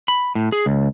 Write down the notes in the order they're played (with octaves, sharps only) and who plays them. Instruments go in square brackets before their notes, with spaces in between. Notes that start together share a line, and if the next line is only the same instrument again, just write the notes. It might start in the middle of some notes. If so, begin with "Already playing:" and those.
[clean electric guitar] B5
A2
G#4
C#2